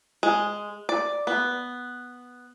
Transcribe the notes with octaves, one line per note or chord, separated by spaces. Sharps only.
G#3
D5
B3